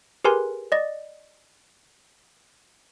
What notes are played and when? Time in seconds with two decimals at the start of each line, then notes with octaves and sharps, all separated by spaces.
0.25 G4 G#4 A#4 B4 G#5 C6
0.72 D5 D#5